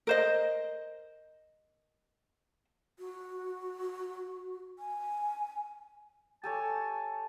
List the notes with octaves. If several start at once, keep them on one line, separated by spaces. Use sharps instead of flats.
A#4 C5 D#5
F#4
G#5
G4 A4 C#5 G#5 A5